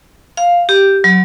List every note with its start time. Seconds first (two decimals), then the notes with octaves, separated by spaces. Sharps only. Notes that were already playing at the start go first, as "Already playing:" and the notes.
0.37 F5
0.69 G4
1.04 F#3